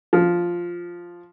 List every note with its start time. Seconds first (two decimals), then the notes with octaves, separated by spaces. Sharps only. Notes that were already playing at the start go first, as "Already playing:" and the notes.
0.13 F3